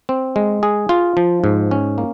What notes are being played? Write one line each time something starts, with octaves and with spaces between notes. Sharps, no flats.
C4
G#3
G#4
F4
F3
G#2
C#4
A#3